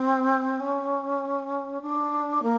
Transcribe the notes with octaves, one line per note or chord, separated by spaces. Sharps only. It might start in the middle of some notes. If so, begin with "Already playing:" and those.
Already playing: C4
C#4
D4
A#3